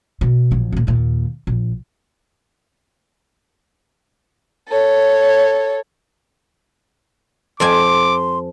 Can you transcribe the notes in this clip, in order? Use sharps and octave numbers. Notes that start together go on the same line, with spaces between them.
B2
A#1 F#3
D#1 A#2
D#2 A#2
A#1
A4 C#5
F2 C4 G#5 C6 D6